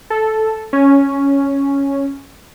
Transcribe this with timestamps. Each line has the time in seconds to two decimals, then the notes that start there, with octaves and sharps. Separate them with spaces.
0.10 A4
0.73 C#4